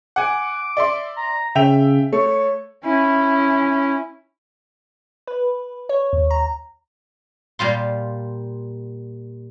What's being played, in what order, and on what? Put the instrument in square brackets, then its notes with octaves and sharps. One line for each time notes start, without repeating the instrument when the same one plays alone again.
[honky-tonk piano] F#5 G#5 [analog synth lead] D6
[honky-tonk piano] D5 E5 C6
[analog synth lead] A#5
[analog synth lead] C#3 [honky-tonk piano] E5 G5 F7
[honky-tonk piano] A3 [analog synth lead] C#5
[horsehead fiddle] C#4 E4
[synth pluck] B4
C#5
D#2
A#5
[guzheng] A#2 G3 F4 C6